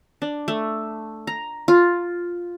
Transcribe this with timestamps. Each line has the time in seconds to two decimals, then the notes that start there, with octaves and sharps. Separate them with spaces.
0.22 D4
0.48 A3
1.27 A#5
1.68 F4